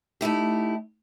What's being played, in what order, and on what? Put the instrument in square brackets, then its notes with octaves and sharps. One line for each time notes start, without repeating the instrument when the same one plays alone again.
[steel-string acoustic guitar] A3 D#4 E4 G4